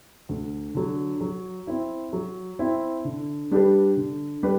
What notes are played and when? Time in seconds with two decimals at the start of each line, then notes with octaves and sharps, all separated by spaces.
0.29 D2
0.75 D3 F#3
1.21 F#3
1.67 C4 E4
2.13 F#3
2.59 C4 E4
3.05 D3
3.51 G3 D4 G4 B4
3.97 D3
4.43 G3 D4 G4 B4